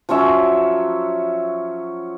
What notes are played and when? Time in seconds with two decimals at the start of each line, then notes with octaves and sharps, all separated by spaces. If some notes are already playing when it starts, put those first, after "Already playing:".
0.09 F3 F#3 C#4 E5